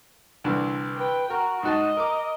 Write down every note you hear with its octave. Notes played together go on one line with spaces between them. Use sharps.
C2 D3 E3
B4 G5
F#4 A#4
G#2 F#4 D#5 A5
A#4 D6